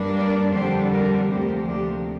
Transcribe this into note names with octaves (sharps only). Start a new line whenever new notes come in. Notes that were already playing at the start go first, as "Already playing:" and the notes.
Already playing: G2 G3 A#3 D4
A#4 D5
F2 D3 G3 D4 G4 C5
A#4 D5
D2 C3 F3 A#3 G4 C5
D4 G4